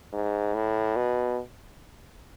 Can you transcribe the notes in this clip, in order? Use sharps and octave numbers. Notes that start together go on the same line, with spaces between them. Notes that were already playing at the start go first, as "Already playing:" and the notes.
G#2
A2
B2